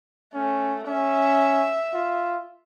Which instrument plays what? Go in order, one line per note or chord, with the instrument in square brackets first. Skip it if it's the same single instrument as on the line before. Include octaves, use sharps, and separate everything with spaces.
[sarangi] A3 [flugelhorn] C#4
[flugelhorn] C#4 [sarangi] E5
[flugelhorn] F4